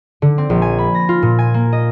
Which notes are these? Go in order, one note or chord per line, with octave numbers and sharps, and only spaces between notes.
D3
C4
A#1
G#5
B5
A#6
F4
A#2
G#5
A#3
D#5